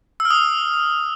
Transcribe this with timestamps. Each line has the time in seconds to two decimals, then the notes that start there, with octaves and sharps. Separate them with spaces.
0.20 E6
0.25 F6
0.30 D#6